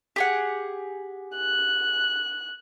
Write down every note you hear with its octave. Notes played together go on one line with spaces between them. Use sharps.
G4 G#4 F#5
F#6